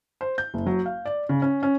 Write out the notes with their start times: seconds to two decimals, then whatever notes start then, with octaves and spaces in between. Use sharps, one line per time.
0.21 C5
0.38 G6
0.54 F#1
0.66 F#3
0.86 F5
1.05 D5
1.29 C#3
1.42 C#4
1.63 C#4